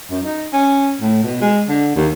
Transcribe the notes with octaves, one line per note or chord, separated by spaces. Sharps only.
F#2
D#4
C#4
A2
B2
G#3
D3
D#2